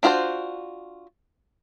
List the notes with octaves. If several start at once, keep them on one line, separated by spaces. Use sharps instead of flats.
D4 F4 F#4 A#4 C5